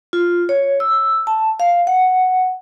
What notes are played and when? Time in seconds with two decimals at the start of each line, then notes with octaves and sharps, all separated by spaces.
0.13 F4
0.49 C#5
0.80 E6
1.27 A5
1.60 F5
1.87 F#5